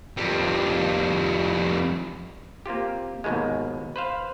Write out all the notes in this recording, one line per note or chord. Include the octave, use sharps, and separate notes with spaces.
F2 G3
A#3 C4 F4 G4
D#2 G#2 B2 D#3 G#3
B4 C5 F5